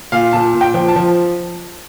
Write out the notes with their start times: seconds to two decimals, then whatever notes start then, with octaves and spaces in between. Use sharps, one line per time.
0.12 A#2 F5
0.33 A#2 A5
0.54 A#2
0.61 G5
0.74 F3
0.88 A5
0.96 F3